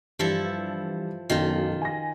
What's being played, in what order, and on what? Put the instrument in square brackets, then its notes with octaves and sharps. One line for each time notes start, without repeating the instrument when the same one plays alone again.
[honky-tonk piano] G2 E3 G3 [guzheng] F3 E4 A4
[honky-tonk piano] F#1 B1 [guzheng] D#3 F4
[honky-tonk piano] G#5 A#6